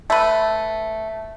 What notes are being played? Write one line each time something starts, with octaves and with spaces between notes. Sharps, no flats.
A3 B4